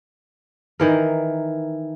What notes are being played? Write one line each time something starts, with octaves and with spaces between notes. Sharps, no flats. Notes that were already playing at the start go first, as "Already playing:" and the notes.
D#3 E3 A#4